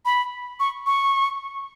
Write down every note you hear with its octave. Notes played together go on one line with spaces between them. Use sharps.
B5
C#6
C#6